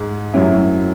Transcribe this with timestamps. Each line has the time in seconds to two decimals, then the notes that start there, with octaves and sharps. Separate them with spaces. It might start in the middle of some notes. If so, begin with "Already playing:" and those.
Already playing: G#2 G#3
0.34 F#2 F#3 C#4 E4